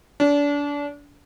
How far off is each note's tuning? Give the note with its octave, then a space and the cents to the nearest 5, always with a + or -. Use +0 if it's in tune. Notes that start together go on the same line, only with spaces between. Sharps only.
D4 -30